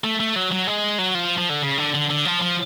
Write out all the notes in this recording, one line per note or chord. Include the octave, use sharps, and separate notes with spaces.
A3
A3
F#3
F#3
G#3
F#3
F3
F3
D3
C#3
D3
D3
D3
F3
F3